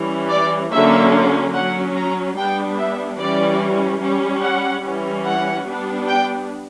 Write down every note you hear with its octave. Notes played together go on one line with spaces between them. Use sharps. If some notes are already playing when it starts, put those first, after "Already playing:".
Already playing: E3 G3 C#4
D5
D3 F#3 A#3 C#4 E5
F#3 C#4 F#5
A#5
G3 B3 D4 G5
E5
E3 G3 C#4 D5
G3 C#4
F#5
E3 G3 C#4
F#5
G3 B3 D4
G5